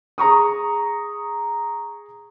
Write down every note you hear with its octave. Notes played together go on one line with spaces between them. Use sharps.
G#4 A#5 C#6 D#6